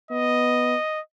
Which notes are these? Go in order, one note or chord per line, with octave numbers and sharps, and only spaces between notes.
B3 D#5